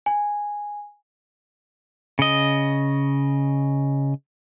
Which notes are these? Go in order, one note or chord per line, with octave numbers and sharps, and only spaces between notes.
G#5
C#3 D#5